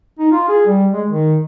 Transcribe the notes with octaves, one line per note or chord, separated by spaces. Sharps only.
D#4
F4
G#4
G3
G#3
D#3